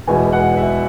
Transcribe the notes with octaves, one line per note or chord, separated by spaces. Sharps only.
E2 B2 G#3 G#5
F#5
E5